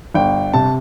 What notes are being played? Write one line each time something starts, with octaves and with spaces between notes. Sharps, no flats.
G1 G5
C3 A5